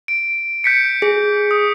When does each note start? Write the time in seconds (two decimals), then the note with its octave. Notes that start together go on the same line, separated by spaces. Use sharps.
0.08 D7
0.64 G6 B6 C#7
1.02 G#4
1.51 D#6